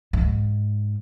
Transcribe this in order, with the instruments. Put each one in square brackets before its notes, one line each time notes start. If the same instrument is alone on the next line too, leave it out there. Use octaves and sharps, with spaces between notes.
[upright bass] G#2